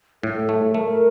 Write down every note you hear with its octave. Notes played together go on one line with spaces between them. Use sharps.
A2 A4
A3
A3 A#4
A#4